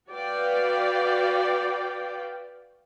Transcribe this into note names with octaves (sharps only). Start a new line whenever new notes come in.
F#4 B4 D5 F5 G5